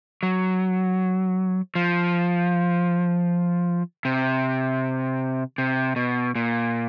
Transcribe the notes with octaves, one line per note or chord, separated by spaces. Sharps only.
F#3
F3
C3
C3
B2
A#2